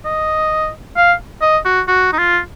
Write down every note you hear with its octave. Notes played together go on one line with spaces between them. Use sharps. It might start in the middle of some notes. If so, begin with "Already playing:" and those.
D#5
F5
D#5
F#4
F#4
D#4
F4